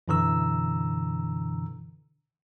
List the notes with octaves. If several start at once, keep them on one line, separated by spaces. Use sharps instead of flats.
F#2 B2 D3 E3 A#5 E6